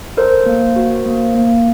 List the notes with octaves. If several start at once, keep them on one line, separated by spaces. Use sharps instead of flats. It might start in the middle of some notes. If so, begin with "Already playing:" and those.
A4 A#4 C5
A#3
F#4
A#3
A#3